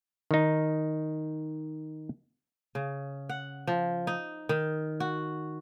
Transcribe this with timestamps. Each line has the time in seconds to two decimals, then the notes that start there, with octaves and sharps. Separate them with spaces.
0.31 D#3 D#4
2.75 C#3
3.29 F#5
3.67 F3
4.07 D#4
4.49 D#3
5.00 F#4